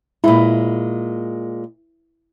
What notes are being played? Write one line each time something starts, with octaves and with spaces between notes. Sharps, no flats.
A#2 G#3 E4